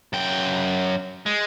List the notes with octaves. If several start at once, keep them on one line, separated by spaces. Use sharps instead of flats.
F#2 G5
G#3